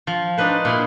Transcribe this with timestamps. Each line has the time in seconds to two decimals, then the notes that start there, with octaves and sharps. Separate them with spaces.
0.07 F3
0.37 D4 D#4 B4 C5
0.65 A#2 E4 G#4